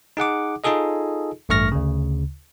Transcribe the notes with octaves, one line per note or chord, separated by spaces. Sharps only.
D#4 G#4 F#5 D6
D#4 F4 G#4 A4 D#5
A1 G2 A3 C#6 F6 A#6
D2 C#3